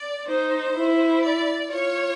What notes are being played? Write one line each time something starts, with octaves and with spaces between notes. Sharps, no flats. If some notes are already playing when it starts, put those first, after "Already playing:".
Already playing: D5
D#4 C5
E4
D5
F4 C#5